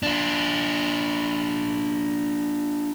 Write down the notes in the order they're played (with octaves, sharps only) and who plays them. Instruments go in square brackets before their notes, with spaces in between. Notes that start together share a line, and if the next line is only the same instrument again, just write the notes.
[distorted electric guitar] D4 F4